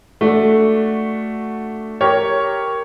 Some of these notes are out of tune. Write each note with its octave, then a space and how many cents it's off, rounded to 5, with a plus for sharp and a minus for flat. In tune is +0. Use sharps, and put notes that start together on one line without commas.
A3 +0 D4 +0 F#4 +0
G4 +0 A#4 -5 C#5 +5